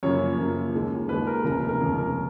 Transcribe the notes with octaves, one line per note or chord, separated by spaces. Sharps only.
F#2 C#3 F3 A#3 C#5
F#2 C#3 F3 A#3
D#2 D#3 G#3
D#2 D#3 G#3 B4
A#4
F1 D#2 C#3 G#3 A#4
A#4
F1 D#2 C#3 G#3 G#4
A#4